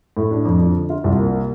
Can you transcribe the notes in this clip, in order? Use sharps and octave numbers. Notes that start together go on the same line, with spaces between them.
A2
D4
F2
D4
D3
F4
C2
A#3